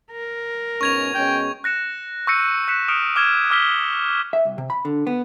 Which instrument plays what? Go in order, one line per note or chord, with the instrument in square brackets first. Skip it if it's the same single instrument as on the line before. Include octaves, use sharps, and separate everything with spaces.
[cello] A#4
[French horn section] G#2 B2 C#4 [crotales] C#6 G#6 F7
[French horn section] B2 G#3 C#4 [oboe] G5
[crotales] F#6 A#6 C#7 E7
C#6 E6 G6 A#6 C#7 D#7
F#6 B6 C#7 E7
D#6 F6 C#7 D7 E7
D6 F6 G#6 E7
D6 E6 F6 B6 G7
[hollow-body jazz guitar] E5
C2
C3
B5
D3
B3